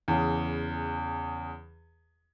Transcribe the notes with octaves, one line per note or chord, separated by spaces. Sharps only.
E2 C#3